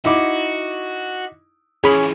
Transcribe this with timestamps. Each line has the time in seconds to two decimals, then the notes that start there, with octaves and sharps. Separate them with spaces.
0.05 D#4 E4 F#4 D6
1.84 E3 F3 C#4 G#4 B5